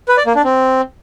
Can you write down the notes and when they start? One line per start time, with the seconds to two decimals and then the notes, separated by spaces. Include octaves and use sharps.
0.08 B4
0.17 D5
0.26 A#3
0.35 D4
0.44 C4